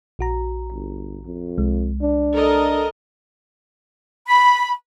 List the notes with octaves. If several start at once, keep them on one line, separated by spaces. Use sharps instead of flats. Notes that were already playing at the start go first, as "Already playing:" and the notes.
A#1 F#4 A#5
G1
F2
C2 G#3
D4
A4 A#4 D#5
B5